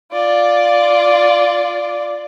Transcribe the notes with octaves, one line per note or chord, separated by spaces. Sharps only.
F4 D5